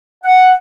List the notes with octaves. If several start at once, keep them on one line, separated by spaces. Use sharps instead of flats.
F#5